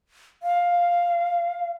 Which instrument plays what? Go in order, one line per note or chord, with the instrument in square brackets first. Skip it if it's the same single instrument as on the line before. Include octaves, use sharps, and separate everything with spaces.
[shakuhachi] F5